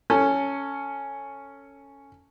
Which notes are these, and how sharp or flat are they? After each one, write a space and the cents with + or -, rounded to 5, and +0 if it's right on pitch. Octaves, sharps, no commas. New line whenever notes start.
C#4 +0 A4 +20